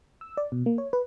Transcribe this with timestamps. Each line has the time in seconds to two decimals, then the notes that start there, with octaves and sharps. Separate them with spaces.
0.21 E6
0.37 D5
0.52 B2
0.66 A#3
0.78 C#5
0.93 B4